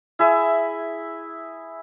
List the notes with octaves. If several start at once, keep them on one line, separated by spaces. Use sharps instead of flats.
E4 G#4 E5